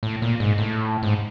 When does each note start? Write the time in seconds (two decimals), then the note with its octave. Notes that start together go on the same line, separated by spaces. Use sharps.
0.03 A2
0.22 A#2
0.40 G#2
0.58 A2
1.03 G#2